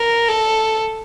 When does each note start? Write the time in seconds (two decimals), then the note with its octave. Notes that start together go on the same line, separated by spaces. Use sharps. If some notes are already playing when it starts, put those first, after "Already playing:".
Already playing: A#4
0.29 A4